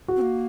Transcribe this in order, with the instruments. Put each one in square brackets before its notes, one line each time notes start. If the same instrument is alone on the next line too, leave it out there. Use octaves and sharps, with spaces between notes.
[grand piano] F#4
[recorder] C4
A#3